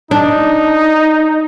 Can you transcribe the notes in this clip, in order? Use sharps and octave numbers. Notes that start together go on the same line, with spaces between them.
D4 D#4